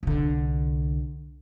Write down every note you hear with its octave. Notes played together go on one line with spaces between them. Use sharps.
C2 D3